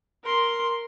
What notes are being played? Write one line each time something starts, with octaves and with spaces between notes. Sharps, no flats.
A#4 C6